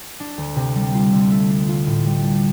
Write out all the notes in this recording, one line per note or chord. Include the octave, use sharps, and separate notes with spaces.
D4
D2
C3
G3
F4
D3
A3
D4
F4
A2
G3
D4